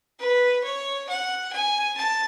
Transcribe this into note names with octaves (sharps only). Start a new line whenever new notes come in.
B4
C#5
F#5
G#5
A5